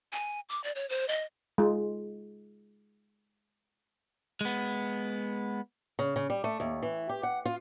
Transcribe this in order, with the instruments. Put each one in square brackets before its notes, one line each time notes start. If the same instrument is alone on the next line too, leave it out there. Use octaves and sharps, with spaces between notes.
[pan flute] G#5
D6
D5
C#5
C5
D#5
[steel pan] G#3 F4
[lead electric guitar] G#3 B3
[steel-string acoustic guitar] C#3
C#3
G3
A3
D#2
E3
G4
F#5
F4